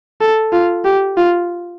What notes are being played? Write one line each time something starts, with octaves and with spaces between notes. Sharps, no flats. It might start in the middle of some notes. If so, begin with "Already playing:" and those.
A4
F4
G4
F4